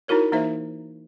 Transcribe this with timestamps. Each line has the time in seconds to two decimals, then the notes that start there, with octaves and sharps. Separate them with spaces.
0.08 D#4 E4 F#4 A#4 C#5
0.32 E3 A#3 D#4 C5 E5